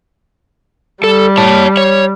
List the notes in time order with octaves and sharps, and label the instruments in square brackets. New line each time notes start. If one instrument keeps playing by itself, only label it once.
[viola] G3 [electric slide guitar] A4
[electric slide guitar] C#5 A5
C#5